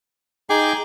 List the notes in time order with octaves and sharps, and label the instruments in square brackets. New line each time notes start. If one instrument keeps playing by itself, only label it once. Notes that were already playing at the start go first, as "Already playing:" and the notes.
[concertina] D#4 G5 D6 [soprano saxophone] G#4